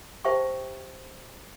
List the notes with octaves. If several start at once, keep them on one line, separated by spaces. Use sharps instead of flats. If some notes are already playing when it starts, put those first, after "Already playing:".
G4 C5 E5 G5 A5 C#6